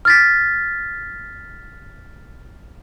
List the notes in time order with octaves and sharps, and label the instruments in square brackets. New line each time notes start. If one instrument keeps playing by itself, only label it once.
[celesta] F6 A6 B6